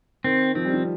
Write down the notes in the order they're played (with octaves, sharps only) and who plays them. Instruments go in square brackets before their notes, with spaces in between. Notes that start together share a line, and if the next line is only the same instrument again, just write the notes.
[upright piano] D#3 [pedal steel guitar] C4
[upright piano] F3 [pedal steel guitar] C4
[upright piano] G3
F3